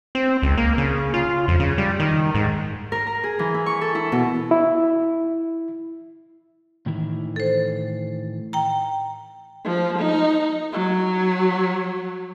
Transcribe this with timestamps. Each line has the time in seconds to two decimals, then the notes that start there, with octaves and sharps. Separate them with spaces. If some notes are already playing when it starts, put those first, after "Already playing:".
0.15 C4
0.42 C#2
0.57 A#3
0.78 C#3
1.14 F4
1.48 F2
1.60 C#3
1.78 G3
2.00 D#3
2.35 G#2
2.92 A#4
3.07 A#5
3.24 G#4
3.39 E3
3.54 E4
3.66 C#6
3.81 A4
3.95 E4
4.12 B2
4.51 E4
6.86 A2 D#3 E3
7.36 A4 C5
8.53 G5 A#5
9.65 F3
9.98 D#4
10.73 F#3